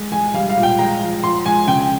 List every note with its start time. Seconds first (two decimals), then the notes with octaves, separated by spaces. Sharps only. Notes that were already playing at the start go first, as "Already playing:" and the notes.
Already playing: G#3
0.12 G#3 G#5
0.34 G3 F5
0.50 F5
0.57 A#2
0.63 G5
0.79 G#3 A#5
1.01 F3
1.23 F3 C6
1.46 G#3 G#5
1.67 C#3 G5